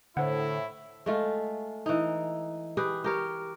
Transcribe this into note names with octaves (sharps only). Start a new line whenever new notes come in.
A2 D3 E4 C5 F#5
G#3 A3 F4
E3 D#4
G4 G#4 B4
G4 A#4 C#5